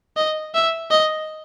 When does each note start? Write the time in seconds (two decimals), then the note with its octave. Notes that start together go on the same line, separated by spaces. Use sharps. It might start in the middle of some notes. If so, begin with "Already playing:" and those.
0.16 D#5
0.54 E5
0.91 D#5